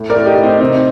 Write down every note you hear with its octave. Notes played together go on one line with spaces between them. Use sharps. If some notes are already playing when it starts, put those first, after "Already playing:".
Already playing: A2
A#4 D5
A2
D#4 G4
A2
C4 D#4
C3 C4 D#4